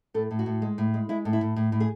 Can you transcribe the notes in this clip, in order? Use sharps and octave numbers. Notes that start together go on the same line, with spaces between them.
A2 A4
A2
F#4
A2
G#3
A2
G#3
G#3 E4
A2
E4
A2
A2
A2
G#4